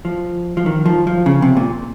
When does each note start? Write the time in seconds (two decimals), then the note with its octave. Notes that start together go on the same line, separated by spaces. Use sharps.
0.05 F3
0.57 F3
0.66 D#3
0.86 F3
1.07 F3
1.26 C#3
1.42 C3
1.57 A#2